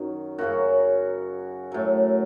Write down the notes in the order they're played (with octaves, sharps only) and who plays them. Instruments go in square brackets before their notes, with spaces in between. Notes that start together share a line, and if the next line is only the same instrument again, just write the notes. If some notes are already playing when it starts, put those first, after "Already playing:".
Already playing: [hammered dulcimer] F#2 D#3 F#3
F#2 C#3 F#3 F#4
A2 F#3